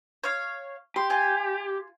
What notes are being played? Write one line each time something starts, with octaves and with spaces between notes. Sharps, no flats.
C#5 F5
G4 C6
F4 G#5